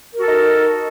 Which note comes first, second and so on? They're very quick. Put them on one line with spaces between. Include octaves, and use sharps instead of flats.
A#4 F#4 A4 D#4